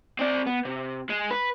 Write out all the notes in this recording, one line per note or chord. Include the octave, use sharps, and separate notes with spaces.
C4 D5
B3
C3
G#3
B4